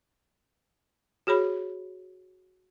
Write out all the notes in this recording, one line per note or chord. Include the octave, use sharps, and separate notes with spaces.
F#4 G#4 C#5 B5